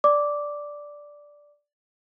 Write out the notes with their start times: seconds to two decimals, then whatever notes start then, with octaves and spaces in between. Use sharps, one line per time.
0.04 D5 D6